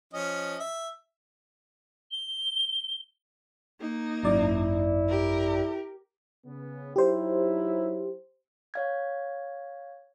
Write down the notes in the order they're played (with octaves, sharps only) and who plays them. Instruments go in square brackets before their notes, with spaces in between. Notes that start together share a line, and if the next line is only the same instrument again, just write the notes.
[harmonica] F3 C#4 D#5
E5
[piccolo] G7
[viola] A#3 D#4
[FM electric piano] G#1 F#2 D5 [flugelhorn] E4
[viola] G4 A#4
[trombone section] C#3 B3
[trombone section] F#3 D#4 E4 [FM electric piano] G4 C5
[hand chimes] C#5 F5 G#6